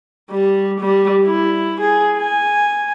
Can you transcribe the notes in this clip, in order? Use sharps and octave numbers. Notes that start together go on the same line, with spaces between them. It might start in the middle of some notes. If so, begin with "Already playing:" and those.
G3
G3
E4
G#4
G#5